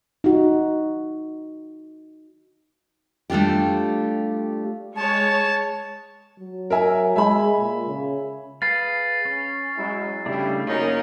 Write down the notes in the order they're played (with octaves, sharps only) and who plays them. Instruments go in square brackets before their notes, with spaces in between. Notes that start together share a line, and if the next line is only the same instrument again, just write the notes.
[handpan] D#4 F#4
[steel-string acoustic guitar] G3 A3 D4 F4 G4
[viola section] G#3 C#5 [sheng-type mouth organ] A5
[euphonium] F#3
[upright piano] A#4 E5 G#5
[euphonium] G#3 [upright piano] E5 G#5 B5
[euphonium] A#2
C#3
[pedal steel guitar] G#4 B4 F5 [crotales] A6 C7
[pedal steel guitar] C#4
[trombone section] F#3 G#3 E4
[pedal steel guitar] C#3 A3 D4 [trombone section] G3 E4
[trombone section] F#2 D#4 [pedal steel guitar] A#3 [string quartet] C#4 A#4